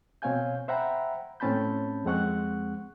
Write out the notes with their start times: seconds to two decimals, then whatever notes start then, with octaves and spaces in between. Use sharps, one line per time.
0.22 B2 C4 C#5 F5 G#5 G6
0.68 C5 E5 F#5 G5 A#5 B5
1.40 A2 C4 C#4 A5 B5 G6
2.05 F2 G#3 C4 F#5 C#6 F#6